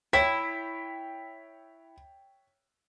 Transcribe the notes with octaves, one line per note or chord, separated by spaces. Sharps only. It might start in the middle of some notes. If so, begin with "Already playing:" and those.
E4 C#5 G5 B6